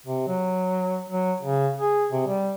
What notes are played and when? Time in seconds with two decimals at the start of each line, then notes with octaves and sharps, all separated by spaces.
0.06 C3
0.27 F#3
1.10 F#3
1.41 C#3
1.78 G#4
2.12 C3
2.27 G3